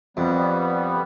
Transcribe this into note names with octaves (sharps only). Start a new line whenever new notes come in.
F2 G3 B3